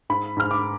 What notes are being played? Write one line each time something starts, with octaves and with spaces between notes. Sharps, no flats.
G#2 B5
G#2 F6
D6